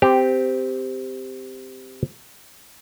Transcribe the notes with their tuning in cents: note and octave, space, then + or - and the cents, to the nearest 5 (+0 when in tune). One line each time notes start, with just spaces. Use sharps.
C4 -15 G4 +5